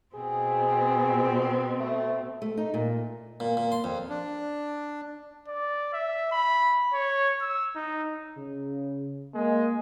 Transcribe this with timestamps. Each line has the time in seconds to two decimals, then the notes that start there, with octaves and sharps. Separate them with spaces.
0.15 B2 C4 G#4
1.80 A3
2.42 A3
2.57 D#4
2.74 A#2
3.40 A#2
3.57 A#2
3.72 C6
3.84 F2
4.10 D4
5.48 D5
5.93 E5
6.32 B5
6.93 C#5
7.41 E6
7.76 D#4
8.37 C#3
9.34 G#3 A#3